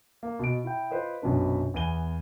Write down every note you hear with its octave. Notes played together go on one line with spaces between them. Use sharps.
A#3
B2 D#5 D7
E4 G5
F4 B4 C5 D#5
A#1 F#2 B2 D4 B4
E2 B3 G#5 D#7 G7